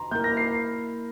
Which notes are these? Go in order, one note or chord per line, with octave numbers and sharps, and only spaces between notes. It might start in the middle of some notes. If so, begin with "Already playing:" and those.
Already playing: A#5 C6
A#3 E4 A#4 G6
A#6
C7